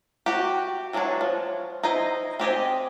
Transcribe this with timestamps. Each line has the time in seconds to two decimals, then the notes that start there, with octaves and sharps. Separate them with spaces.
0.26 F#4 G4
0.93 E3 F#3 G#3 D4 C#5
1.21 F3
1.83 D#4 E4 C5 D#5
2.40 C4 G4 G#4 D#5